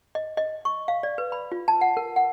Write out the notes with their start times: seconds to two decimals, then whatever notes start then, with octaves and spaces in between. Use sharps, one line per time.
0.15 D#5
0.37 D#5
0.65 C#6
0.88 F5
1.03 D5
1.18 B4
1.32 B5
1.52 F4
1.68 A5
1.81 F#5
1.97 A#4
2.16 F#5